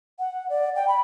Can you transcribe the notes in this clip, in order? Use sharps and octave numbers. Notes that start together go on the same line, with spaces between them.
F#5
D5
G5
B5